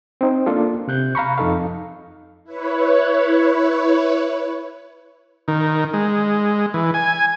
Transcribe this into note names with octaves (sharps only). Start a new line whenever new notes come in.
C4 D#4
A#3 D4 F4 A4
C3 F#6 G6
F5 A#5 B5 C#6
F2 D#4 A4 F5
E4 B4 C#5
D#3
G#3
E3
G#5